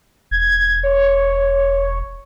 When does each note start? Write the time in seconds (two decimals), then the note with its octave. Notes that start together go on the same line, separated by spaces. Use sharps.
0.31 E1 G#6
0.83 C#5